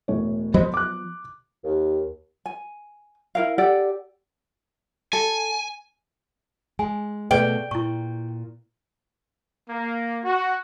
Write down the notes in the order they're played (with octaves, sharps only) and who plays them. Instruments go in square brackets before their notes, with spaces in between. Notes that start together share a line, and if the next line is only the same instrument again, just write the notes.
[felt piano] E1 A2 C#5
[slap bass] F3 F#3 B3 [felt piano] C5 D#5 B5
[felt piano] D6 F#6
[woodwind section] D#2
[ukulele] G#5
E4 A#4 F5
G4 A4 D5 F#5
[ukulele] A4 [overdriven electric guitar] G#5
[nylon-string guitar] G#3 [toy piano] G#5
[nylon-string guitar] B2 A3 [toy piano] G#4 B4 D5 [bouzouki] G5
[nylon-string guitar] A#2 [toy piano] E4 C#6
[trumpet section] A#3
F#4